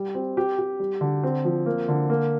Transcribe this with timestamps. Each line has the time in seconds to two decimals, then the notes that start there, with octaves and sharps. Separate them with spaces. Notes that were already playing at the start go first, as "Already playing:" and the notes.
Already playing: G3
0.15 C4
0.37 G4
0.58 G4
0.80 G3
1.01 D3
1.23 C4
1.45 F3
1.66 A#3
1.88 D3
2.10 A#3